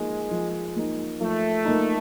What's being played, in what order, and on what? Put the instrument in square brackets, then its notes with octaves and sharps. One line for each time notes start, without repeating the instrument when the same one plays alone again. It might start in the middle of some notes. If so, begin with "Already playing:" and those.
Already playing: [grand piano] F3 A#3 D#4 [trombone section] G#3
[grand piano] F3
A#3 D#4
[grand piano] F3 [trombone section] A3
[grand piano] A#3 D#4